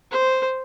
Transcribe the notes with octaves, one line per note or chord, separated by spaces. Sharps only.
C5